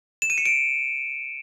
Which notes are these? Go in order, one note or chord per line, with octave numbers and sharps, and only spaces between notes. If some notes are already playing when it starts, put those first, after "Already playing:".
E7
D#7
C#7
D7